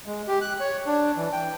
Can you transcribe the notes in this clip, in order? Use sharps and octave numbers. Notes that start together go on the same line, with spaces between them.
G#3
G4
F#6
C#5
D4
E3
G5